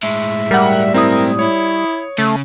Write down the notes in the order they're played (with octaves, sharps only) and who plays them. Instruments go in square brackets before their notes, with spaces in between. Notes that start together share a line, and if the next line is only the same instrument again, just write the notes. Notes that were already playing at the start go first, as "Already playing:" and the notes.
[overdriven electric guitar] A2 G#3 [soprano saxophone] E5
[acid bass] G3 [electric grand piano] A#4 F#5
[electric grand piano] C4 E4 D#6 [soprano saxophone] A#4
[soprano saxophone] E4 [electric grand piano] C#5
[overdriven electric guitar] C#3 [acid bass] A3